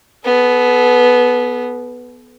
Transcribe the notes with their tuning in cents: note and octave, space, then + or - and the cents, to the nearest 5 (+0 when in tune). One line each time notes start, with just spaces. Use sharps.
B3 +0 A4 -40